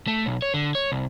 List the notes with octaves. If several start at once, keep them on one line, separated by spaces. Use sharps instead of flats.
A3
B1
C#5
D3
C#5
C2